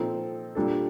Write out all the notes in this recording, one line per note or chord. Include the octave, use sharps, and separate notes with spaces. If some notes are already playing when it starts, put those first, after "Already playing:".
Already playing: A#2 F3 C4 D#4 A4
A#2 G3 D4 A4